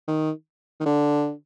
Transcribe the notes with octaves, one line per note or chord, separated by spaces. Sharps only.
D#3
D#3
D3